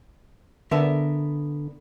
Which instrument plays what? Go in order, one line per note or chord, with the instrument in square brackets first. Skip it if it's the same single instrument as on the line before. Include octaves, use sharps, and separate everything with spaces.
[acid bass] D3 [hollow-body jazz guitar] B3 A#4 E5